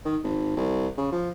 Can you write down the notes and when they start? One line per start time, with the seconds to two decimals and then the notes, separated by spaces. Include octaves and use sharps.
0.05 D#3
0.23 G#1
0.56 C2
0.97 C#3
1.12 F3